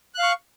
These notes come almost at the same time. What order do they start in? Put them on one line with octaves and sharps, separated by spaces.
F#6 F5 C#6